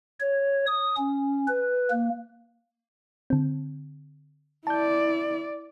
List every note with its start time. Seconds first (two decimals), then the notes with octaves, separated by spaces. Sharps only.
0.20 C#5
0.67 D#6
0.97 C#4
1.48 B4
1.91 A#3
3.30 D3 C4
4.67 E4 D5 A5 G6